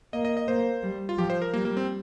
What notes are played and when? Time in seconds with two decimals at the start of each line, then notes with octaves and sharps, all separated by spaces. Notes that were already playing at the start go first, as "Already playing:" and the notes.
0.13 A#3 D#5
0.25 D#5
0.37 D#5
0.48 A#3 C5
0.83 G3
1.09 F4
1.18 F3 G4
1.30 C5
1.42 A#4
1.53 G3 A#3
1.65 A#3
1.77 C4